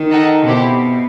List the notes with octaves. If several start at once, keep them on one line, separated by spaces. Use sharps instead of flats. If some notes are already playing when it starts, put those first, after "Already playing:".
Already playing: D#3
D#4 A4 D#5 F#5
B2 C4 E4 G4